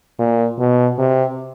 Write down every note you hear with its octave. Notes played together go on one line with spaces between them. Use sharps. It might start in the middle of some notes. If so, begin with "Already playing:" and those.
A#2
B2
C3